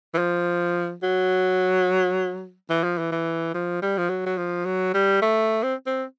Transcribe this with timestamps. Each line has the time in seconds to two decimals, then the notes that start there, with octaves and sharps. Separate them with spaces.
0.14 E3
0.18 F3
1.03 F#3
2.70 E3
2.84 F3
2.98 E3
3.12 E3
3.54 F3
3.82 G3
3.98 F3
4.09 F#3
4.26 F#3
4.38 F3
4.65 F#3
4.94 G3
5.22 A3
5.63 C4
5.87 C4